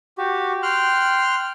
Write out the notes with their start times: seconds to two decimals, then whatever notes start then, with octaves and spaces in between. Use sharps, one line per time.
0.18 F#4 G4
0.63 G5 C6 F6 F#6